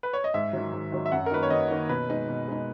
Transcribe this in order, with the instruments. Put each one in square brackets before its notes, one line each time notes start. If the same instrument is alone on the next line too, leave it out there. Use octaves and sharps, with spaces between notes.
[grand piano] B4
C#5
D#5
[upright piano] G#2 [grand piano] E5
[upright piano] D#3 F#3
G#2
D#3 F#3
[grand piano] E5
[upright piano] F#2 [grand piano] F#5
[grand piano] A#4
[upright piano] D#3 A#3 D#4 F#4 [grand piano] B4
[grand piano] C#5
[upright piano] F#2 [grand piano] D#5
[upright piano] D#3 A#3 D#4 F#4
[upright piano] B2 [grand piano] B4
[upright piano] G#3 D#4
B2
G#3 D#4